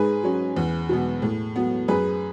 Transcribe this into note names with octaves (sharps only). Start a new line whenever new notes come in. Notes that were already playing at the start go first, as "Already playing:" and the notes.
Already playing: G#2 G#4 B4
F#3 C#4
E2
B2 F#3 B3
A2
F#3 B3
F#2 G#4 B4